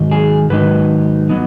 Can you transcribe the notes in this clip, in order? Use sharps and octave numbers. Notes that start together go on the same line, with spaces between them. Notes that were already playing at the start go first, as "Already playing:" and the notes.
Already playing: G#2 D#3 F#3 D#4
G#4
G#2 D#3 F#3 D#4 B4
F#3 B3 D#4